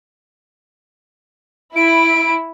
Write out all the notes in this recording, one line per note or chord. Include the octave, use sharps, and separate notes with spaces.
E4 D7